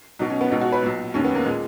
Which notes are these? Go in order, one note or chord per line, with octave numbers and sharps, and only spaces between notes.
B1 B2 D#4
C#4
B3
C#2 B2 D#4
F#4
B4
B1 A#2
F1 D#2 D#3 C#4
B3
A#3
A#2 G#3